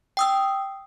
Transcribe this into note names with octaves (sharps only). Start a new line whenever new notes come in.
G5 D#6 E6